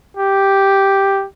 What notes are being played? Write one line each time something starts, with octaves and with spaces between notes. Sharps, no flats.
G4